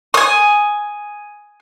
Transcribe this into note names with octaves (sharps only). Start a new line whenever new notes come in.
G#5 D#6